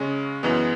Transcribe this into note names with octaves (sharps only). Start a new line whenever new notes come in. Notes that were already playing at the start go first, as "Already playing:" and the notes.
Already playing: C#3 G#3 C#4
F#2 E3 G#3 B3